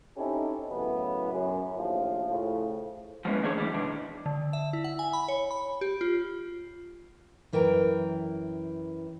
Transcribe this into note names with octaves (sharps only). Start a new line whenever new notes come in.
C4 C#4 D#4 E4 G4 A4
F#2 A2 C#3 E3 B3
F#2
A#1 D#2 A2 F3
A2 C#3 F3
F3 G#3 A#3 B3 C#4 E4
D#3 A3 D4 G#4 A#4 C#5
E3 G3
B2 D#3 D4
D3
E5
E4
F#5
G#5
B5
C#5
B5
G4
F4
F#2 E3 A#4 G5 A5 A#5